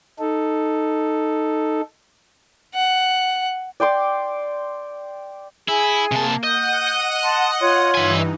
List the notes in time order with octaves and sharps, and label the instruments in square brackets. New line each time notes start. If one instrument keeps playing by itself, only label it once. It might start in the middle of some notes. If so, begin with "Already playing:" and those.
[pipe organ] D#4 A4
[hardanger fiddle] F#5
[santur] D5 G5 C6 D6
[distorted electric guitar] E4 [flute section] G#4 G#5
[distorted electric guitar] C3 A5 [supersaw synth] A#3
[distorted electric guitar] D#5 [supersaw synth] F#5 F#6 D#7 [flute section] G6
[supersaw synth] F#5 [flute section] A5 C6
[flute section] F4 C#5 C6
[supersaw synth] G2 E3 D#4 [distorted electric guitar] E5 G#5